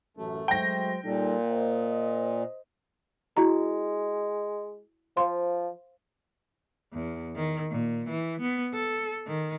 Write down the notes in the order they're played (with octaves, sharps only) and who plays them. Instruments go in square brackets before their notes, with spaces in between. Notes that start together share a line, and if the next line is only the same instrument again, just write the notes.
[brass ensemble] A1 F#2 [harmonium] A3
[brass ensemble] F#3 G#3 C5 [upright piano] G5 A#6
[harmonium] A#2 [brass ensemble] G3 D#4 A4
[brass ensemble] C5 D#5
[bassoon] G#3 [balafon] E4 F#4 A#5
[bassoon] F3 [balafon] C5 F5 C6
[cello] E2
D#3
A#2
E3
B3
A4
D#3